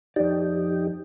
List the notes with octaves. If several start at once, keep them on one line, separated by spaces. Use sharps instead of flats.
F2 D#4 G4 D5